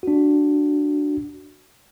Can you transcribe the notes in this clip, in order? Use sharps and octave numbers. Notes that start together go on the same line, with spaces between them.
D4 F#4